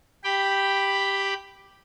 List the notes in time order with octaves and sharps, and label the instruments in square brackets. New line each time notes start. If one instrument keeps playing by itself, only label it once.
[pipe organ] G4 G5 B5